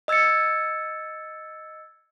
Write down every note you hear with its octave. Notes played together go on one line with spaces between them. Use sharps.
D#5 E6 G#6 A6 C#7